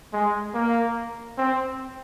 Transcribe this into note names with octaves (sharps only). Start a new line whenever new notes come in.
G#3
A#3
C4